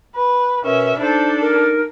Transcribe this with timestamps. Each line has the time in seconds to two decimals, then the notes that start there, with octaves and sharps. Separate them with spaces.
0.15 B4
0.64 B2 C#4 A#4 B4 E5
0.99 D4 D#4 A4 C5
1.41 A#4